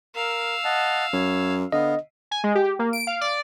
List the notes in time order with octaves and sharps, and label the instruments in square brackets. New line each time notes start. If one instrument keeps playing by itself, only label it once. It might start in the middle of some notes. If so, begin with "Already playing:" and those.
[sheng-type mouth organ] A#4 [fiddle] F5 E6
[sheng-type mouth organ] D#5 F#5 A5
[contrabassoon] F#2 [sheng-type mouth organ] C#5
[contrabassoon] D3 [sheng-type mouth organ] B3 F5 [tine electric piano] D#5
[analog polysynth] G#5
G#3
G4
A#3
D7
F5
D5